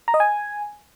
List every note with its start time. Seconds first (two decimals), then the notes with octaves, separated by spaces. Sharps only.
0.08 A#5
0.14 D#5
0.20 G#5